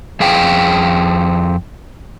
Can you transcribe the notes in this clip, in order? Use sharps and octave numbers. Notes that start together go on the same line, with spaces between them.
F2 G#4 F5 G5